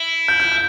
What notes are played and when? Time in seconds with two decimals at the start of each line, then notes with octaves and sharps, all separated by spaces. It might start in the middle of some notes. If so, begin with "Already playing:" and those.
Already playing: E4
0.28 G6
0.40 G6
0.52 G6